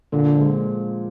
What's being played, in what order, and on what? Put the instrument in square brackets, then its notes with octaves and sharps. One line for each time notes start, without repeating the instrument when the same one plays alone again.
[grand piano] A#2 [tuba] D3
[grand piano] F3 G#3